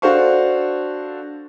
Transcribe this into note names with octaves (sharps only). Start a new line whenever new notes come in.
D4 F#4 A4 C5 F5 C#6